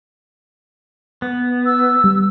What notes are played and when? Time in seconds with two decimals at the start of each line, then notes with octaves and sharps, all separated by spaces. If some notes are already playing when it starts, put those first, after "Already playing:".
1.22 B3
1.66 E6
2.04 G3